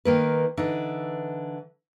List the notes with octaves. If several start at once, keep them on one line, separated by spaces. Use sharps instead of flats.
D#3 A#3 B4
D3 E3 D#4